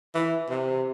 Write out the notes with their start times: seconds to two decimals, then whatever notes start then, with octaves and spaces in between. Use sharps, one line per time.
0.15 E3
0.50 C3